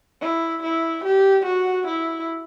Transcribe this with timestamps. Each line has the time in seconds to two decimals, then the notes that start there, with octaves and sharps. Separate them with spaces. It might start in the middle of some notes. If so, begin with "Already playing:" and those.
0.21 E4
0.63 E4
1.04 G4
1.46 F#4
1.87 E4